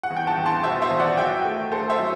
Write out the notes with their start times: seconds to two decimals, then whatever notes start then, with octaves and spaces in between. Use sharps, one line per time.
0.03 F#5
0.10 E2
0.16 G5
0.27 F#5 A5
0.37 E2
0.46 A5 C6
0.64 B2 C5 E5
0.82 C5 E5
0.90 E2
1.00 D5 F#5
1.17 F#3 E5 G5
1.45 A3
1.72 A3 A4 C5
1.90 C5 E5
1.99 F#3